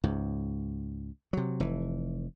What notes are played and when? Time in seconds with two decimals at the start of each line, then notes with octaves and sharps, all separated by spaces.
0.04 C#2 G#2
1.33 C3 F#3
1.60 F1 E3